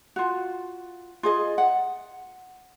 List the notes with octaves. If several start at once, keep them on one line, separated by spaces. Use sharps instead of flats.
F4 F#4
F4 G#4 D#5
F#5